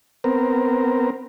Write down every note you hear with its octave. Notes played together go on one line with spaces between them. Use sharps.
B3 C4 A#4